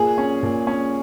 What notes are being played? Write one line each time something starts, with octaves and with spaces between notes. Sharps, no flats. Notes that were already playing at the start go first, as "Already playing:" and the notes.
Already playing: A#2 G#4
C#4
A#2
C#4